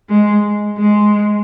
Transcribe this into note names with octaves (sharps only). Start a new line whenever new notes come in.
G#3
G#3